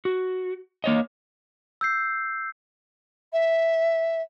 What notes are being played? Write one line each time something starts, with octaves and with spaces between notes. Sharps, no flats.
F#4
A#3 C#5 D#5
E6 G6 C7
E5